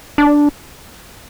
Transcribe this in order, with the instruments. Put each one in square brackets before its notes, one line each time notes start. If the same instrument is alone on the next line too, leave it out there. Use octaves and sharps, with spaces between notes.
[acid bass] D4